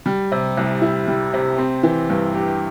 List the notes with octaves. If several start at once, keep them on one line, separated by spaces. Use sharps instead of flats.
G3
C3
C2
E4
G3
C3
C4
E3
G2
G4